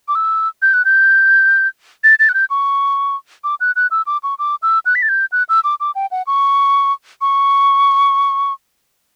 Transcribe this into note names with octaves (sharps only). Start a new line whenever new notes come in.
D6
E6
G6
F#6
G6
A6
A6
F#6
G6
C#6
D6
F#6
F#6
E6
D6
C#6
D6
E6
F#6
B6
A6
G6
F#6
E6
D6
D6
G5
F#5
C#6
C#6